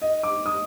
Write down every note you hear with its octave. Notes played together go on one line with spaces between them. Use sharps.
D#5
D6
D#6